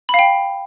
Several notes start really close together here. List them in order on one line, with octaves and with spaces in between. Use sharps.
B5 F5 G5